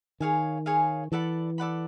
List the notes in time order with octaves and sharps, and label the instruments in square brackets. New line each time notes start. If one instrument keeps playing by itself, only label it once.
[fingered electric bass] D#3 [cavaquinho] G#4 C#5 F5 G#5
[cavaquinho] G#4 C#5 F5 G#5
[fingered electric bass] E3 [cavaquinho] A4 D5 F#5 B5
[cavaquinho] A4 D5 F#5 B5